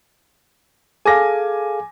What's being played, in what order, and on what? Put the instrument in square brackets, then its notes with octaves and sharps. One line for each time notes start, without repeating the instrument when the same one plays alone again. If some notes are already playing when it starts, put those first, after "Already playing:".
[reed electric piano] G#4 A4 F5 [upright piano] G#5 D6 A#6